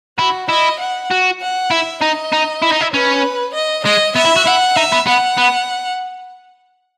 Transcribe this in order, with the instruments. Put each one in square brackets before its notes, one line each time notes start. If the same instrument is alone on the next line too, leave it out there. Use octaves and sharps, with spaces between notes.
[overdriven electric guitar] E4 [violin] F#4
[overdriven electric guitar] E4 [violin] D#5
[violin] F#5
[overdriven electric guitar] F#4
[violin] F#5
[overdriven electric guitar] E4 [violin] E5
[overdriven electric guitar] D#4 [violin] D#5
[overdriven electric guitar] D#4
E4
D#4
E4
[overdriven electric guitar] C#4 [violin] B4
[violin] D#5
[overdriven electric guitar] G#3 [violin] D#5
[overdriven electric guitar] B3 [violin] E5
[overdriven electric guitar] E4
F#4
[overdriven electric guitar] E4 [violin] F#5
[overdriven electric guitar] D#4 [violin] E5
[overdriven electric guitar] B3
[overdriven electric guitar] B3 [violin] F#5
[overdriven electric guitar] B3